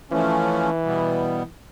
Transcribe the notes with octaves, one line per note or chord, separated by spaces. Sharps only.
E3 F3 A3 C#4
B2 G3 B3